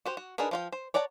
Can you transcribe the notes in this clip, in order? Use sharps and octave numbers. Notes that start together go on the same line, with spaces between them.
F#4 G4 C5
F#4
D4 D#4 G#4 A#4 B4
F3 F4 G5
C5
C#5 D5 F#5 A5 A#5